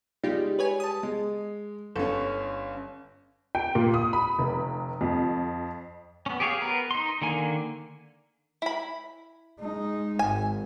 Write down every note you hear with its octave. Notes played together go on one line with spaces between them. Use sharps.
G3 G#3 D#4 F4 G4
B4 C#5 G#5
A5 D#6
G#3
G1 C#4 A4
G5
A#2
D#6
B5
F1
F2
B3 C#4
G4 G#4 C#5 F5
B3 A#4 B4
D#4 C6
D3 D#3 A#3 G#5
E4 B5
G#3 D#4
G#1 G#5